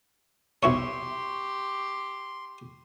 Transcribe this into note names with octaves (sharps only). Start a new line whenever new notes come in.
B1 E4 G4 C#5 C6 C#6